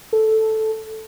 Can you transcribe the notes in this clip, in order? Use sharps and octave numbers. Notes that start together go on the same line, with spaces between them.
A4